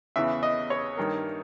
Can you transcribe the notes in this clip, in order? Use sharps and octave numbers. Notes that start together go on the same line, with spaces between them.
E2 C#3 E3 E5
D#5
C#5
G2 D#3 A#3